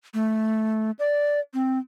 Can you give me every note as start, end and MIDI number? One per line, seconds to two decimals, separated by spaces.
0.14 0.91 57
0.99 1.40 74
1.54 1.78 60